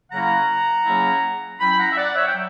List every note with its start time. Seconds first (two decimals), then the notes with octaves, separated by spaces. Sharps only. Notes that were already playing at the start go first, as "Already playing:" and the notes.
0.11 C#3 F#3 A#3 C#4 E4 F#5 A#5
0.85 C#3 F#3 A#3 C#4 E4
1.60 F#3 C#4 E4 G5 B5
1.79 F#5 A#5
1.92 E5
1.97 D5 F#5
2.16 C#5 E5
2.28 G5
2.34 F#3